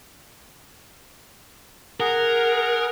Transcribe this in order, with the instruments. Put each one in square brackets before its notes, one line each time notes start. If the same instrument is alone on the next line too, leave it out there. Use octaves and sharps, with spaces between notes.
[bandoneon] G#4 F#5 [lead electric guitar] A#4